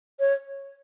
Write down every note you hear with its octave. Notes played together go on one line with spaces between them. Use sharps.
C#5